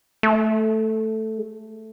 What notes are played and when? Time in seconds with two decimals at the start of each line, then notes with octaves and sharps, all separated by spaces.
0.23 A3
1.38 G#3
1.43 A3